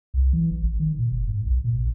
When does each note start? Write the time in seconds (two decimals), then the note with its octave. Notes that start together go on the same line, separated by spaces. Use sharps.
0.14 C2
0.33 E3
0.51 G#1
0.63 G#1
0.80 D#3
0.98 A#2
1.12 F#1
1.28 G#2
1.46 B1
1.64 A#2
1.78 A1